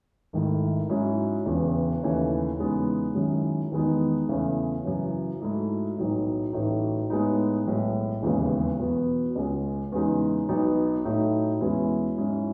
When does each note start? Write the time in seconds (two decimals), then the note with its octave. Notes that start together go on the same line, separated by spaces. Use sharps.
0.33 G#1 G#2 D#3 A3 E4
0.89 G#2 F#3 C#4 E4
1.46 E1 E2 C#3
2.03 D#2 C#3 E3 A3 E4
2.58 E2 C#3 G#3 B3 D#4
3.15 F#2 D#3 G#3 C#4 E4
3.72 E2 D#3 G#3 B3 D#4
4.29 E2 C#3 E3 A3
4.84 F#2 C#3 E3
5.41 G#2 F#3 A3 E4
5.97 B1 A2 F#3 A3 D#4
6.53 A1 A2 F#3 A3 D#4
7.10 A2 G#3 B3 D#4
7.66 B1 A2 G#3
8.23 E1 D#2 C#3 G#3 B3
8.79 E2 B2 F#3 B3
9.35 C#2 C#3 G#3 C#4
9.92 E2 C#3 G#3 D#4
10.48 B1 B2 F#3 B3 D#4
11.05 A2 F#3 A3 D#4
11.61 E2 B2 G#3 C#4 E4
12.18 G#2 F#3 C#4 E4